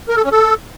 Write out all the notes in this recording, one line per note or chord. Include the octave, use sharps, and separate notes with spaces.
A#4
A4
C#4
A4